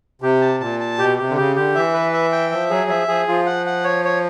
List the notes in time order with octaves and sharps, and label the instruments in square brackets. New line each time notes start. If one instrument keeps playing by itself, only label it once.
[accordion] C3 [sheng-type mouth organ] G4
[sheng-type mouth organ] A5
[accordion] A#2 [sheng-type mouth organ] A5
[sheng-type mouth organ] A5
[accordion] B2 [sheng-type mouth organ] G4
[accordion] C3 [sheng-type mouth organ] G4
[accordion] D3
[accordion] C#3 [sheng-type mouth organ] G4
[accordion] D3 [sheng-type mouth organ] G4
[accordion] E3 [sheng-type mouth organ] E5
[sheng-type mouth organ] B4
E5
G5
[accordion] F3 [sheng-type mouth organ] E5
[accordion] F#3 [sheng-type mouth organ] G#4
[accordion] F3 [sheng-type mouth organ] E5
[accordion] F3 [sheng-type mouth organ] G#4
[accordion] F3 [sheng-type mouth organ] F4
[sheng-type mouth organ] F#5
F#5
C#5
C#5